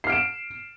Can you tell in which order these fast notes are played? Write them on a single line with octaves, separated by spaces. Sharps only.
C7 F6 D7 E7